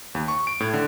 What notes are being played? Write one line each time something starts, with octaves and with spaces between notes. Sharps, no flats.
D#2
C#6
D7
A2
D3